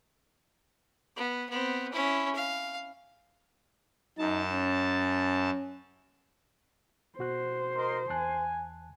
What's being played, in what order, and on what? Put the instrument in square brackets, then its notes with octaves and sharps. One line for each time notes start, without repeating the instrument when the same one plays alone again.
[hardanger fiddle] B3
B3 C4
C#4 E4
F5
[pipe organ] F#2 A5 [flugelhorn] D#4
[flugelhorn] C#4
[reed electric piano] B2 F#4 F#6 [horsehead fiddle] C5
[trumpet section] A#4 D#5 C6
[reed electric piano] E2 A5 F#6 [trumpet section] G#5